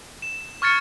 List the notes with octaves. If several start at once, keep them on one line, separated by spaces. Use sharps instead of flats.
E7
C#6 F6 G#6 A6 C#7